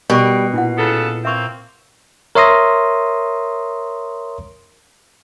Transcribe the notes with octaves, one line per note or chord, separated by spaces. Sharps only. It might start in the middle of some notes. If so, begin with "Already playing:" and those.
B2 G3 A#4 G5 C#6
A#2 D4 E4 F#5
C#3 B3 A4
A#3 C4 E5 C#6
A#4 C#5 E5 C6 D#6 A#6